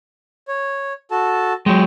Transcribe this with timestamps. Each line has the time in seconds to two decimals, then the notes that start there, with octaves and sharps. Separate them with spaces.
0.48 C#5
1.11 F#4 A4 A5
1.66 F#3 G#3 G5